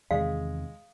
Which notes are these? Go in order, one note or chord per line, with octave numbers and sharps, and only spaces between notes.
E2 C3 D#3 G#3 F5